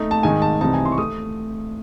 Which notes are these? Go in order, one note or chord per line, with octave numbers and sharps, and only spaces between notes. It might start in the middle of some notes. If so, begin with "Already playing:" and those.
Already playing: A3 D#4
A5
G#2 D#3 G#3 D#4 G#5
A5
C2 C3 E3 C4 D#4 A5
G#5
C6
C#6
A3 D#6